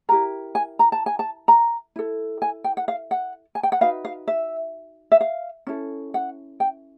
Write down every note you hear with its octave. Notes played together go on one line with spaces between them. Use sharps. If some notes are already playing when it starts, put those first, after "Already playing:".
E4 G4 A#4 A#5
G#5
A#5
A5
G#5
A5
A#5
E4 A4
G#5
G5
F#5
F5
F#5
G#5
G5
F#5
D#4 F#4 B4 F5
F5
E5
E5
F5
C#4 E4 A4
F#5
G5